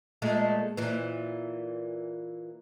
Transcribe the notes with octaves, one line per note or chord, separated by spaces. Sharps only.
A#2 G#3 A3
A#2 E3